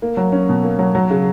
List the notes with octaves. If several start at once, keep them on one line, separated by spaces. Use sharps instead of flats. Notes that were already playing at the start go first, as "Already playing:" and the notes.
A#3
F#3
C#4
B2
A#3
F#3
F#3
C#3